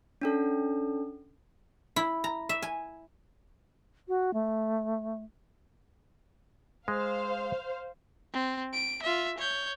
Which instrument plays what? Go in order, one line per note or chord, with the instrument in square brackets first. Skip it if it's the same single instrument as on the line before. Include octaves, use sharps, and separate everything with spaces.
[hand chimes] C#4 D4 A4
[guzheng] E4
A#5
E5
G#5
[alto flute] F#4
A3
[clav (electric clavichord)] G#3 [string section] C5 F5
[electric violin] C4
D7
F4 E5
C#5 G6